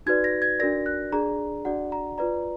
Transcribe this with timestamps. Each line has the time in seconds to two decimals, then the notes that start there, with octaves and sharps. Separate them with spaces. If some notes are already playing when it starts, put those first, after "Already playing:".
0.06 D#4 F#4 B4 D5 G#6
0.24 A#6
0.42 G#6
0.59 D4 F#4 A#4 D5 A#6
0.86 F#6
1.12 D4 G#4 D5 A#5
1.65 D4 F#4 D5 F#5
1.92 A#5
2.18 F4 B4 D5 A#5